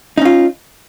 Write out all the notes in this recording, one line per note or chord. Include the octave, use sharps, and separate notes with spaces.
C#4 D#4 F4